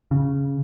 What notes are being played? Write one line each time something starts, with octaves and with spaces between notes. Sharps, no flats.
C#3